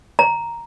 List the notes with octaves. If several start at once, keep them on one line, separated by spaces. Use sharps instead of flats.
A#5